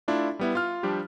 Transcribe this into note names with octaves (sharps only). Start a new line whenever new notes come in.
A3 D4 E4 F4
G3 B3 E4
F4 F6
F3 G3 D4 G4